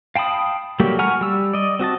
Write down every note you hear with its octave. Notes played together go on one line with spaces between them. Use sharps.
F5 G5 A5 B5 D#6
F#3 G3 A3 A#3 G4
F#5 G#5 A#5 C#6 F6
G3 E6
D5 D#5
C4 F#4 D#5 A5